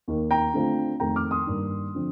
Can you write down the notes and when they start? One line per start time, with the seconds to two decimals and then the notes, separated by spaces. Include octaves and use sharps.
0.08 D#2 D#3 A#3
0.31 G5 A#5
0.54 D3 A3 C4 F4
1.00 F2 D#3 A3 G5 A#5
1.16 D6 F6
1.31 C6 D#6
1.47 G2 D#3 A#3 D4
1.95 D3 F3 C4